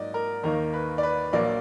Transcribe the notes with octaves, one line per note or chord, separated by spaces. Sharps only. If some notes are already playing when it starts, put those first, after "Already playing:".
Already playing: G#2 F#3 A#3 D#4 D5 D#5
A#4
D#2 D#3 A#3 D#4 A#4
B4
D5
B4
A#1 A#2 F#3 A#3 D5